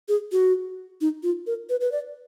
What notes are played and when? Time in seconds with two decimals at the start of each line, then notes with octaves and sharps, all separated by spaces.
0.09 G#4
0.32 F#4
1.01 D#4
1.23 F4
1.47 A#4
1.69 B4
1.81 B4
1.92 D5